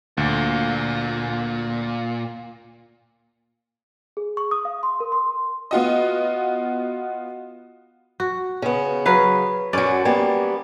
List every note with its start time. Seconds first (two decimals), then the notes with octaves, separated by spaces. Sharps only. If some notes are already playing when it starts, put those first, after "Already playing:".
0.17 D2 A#2
4.17 G#4
4.37 C#6
4.51 D#6
4.65 F5
4.83 C6
5.00 A#4
5.12 C6
5.71 B3 F4 F#4 D#5
8.20 F#4
8.62 C#3 B3
9.06 F#3 B4 F5
9.73 F#2 F#3 C#4 D5
10.05 G3 A#3 B3 C#5